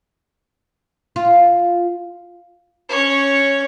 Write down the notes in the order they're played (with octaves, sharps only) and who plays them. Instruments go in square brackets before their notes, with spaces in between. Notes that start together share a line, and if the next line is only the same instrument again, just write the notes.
[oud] F4
[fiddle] C#4 C#5